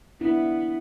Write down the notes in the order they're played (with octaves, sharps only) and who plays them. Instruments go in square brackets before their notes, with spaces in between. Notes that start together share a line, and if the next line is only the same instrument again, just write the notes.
[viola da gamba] B3 [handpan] D4 E4